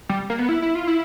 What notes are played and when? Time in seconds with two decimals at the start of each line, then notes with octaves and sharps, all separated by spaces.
0.09 G3
0.30 A#3
0.39 B3
0.49 E4
0.62 E4
0.75 F4
0.87 E4